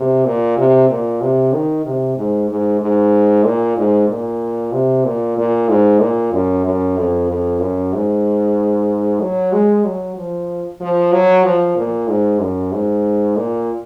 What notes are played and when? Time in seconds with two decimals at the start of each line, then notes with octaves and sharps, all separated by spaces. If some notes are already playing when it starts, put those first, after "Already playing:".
Already playing: C3
0.25 A#2
0.57 C3
0.89 A#2
1.21 C3
1.53 D#3
1.85 C3
2.17 G#2
2.49 G#2
2.81 G#2
3.45 A#2
3.77 G#2
4.09 A#2
4.72 C3
5.05 A#2
5.37 A#2
5.69 G#2
6.01 A#2
6.32 F#2
6.65 F#2
6.97 F2
7.29 F2
7.60 F#2
7.93 G#2
9.21 F#3
9.52 G#3
9.85 F#3
10.16 F3
10.81 F3
11.12 F#3
11.44 F3
11.76 A#2
12.08 G#2
12.40 F#2
12.72 G#2
13.36 A#2